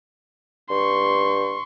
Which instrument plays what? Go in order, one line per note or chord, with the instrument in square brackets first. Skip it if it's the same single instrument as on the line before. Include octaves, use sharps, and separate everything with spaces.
[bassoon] G2 [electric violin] C6 C#6